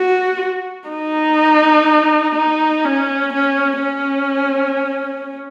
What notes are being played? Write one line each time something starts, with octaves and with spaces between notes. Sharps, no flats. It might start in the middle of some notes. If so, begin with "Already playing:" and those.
Already playing: F#4
D#4
D#4
C#4
C#4
C#4